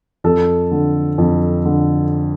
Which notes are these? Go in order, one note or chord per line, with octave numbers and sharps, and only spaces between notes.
F2 A4
D3
F2
D3